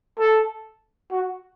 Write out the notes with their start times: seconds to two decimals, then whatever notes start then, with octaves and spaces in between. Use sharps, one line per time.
0.19 A4
1.11 F#4